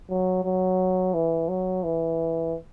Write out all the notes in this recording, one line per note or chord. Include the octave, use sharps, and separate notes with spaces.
F#3
F#3
E3
F#3
E3